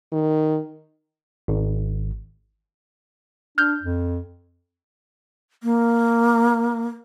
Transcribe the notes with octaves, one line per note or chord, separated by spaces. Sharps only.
D#3
G#1
D4 F6 G6
F2
A#3